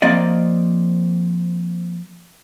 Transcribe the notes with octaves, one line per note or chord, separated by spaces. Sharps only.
F3 A#3 C4 D5 D#5